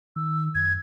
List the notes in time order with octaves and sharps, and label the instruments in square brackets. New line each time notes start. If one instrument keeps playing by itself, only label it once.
[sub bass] D#3 [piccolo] E6
[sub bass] F#2 [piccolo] G#6